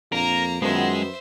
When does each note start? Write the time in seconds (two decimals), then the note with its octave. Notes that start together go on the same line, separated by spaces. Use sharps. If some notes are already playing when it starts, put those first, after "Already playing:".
0.12 A#1 F2 A#3 A#4 A#5
0.62 F#2 D#3 F3 G#3 B3 C5 E5